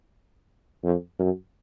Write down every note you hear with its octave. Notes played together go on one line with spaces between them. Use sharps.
F2
F#2